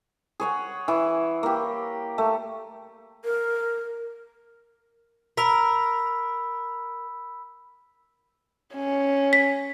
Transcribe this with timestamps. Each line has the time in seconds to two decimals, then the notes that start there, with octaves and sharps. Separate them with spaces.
0.40 G#4 C#5 F#5
0.88 E3
1.43 A#3 G4
2.18 A3
3.25 A#4
5.37 A#4 B5 E6 B6
8.75 C#4
9.33 B6